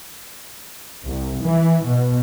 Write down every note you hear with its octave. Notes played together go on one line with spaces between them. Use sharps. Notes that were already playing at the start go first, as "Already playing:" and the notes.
C2
E3
B2